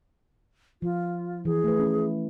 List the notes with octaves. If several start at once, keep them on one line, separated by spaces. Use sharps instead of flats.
F3 F4
E3 G#4
A3 B4
C#4 E4